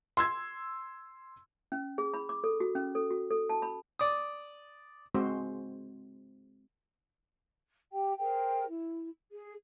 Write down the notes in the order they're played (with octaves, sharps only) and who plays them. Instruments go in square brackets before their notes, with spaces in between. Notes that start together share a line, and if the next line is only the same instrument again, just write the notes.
[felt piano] C6 E6 G#6
[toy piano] C#4
G#4
B5
D6
A4
F#4
C#4
A4
F#4
A4
A5
B5
[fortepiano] D5 D#6
[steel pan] G#3 C4 F#4 C5
[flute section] G4 G5
G#4 A#4 C5 G5
E4
G#4